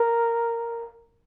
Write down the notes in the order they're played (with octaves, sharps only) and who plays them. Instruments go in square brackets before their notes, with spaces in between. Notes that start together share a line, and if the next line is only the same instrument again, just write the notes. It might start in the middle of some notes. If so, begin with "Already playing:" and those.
Already playing: [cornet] A#4